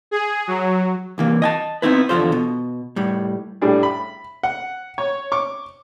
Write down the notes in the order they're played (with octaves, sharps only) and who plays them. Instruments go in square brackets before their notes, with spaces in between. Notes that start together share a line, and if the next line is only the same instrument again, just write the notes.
[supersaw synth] G#4
F#3
[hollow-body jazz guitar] C2 E3 A#3
D#5 G#5 A5
B3 C4 D#4 E4 B4
E2 D3 F3 F4 A4 C5
B2
A2 G3
[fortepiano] A2 G3 D4 G#4
B5
F#5
C#5
C#6 D6